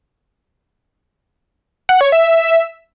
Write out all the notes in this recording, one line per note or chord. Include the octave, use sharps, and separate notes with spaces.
F#5
C#5
E5